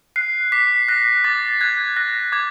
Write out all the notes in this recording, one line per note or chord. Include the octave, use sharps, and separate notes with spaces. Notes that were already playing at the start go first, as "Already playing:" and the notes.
F#6 C7
D6 B6
F#6 A#6
D6 A6
F#6 G#6
F#6 A#6
D6 G#6